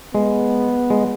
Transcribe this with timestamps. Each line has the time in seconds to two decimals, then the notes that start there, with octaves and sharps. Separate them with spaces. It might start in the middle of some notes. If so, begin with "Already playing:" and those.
0.14 G#3 B3
0.90 G#3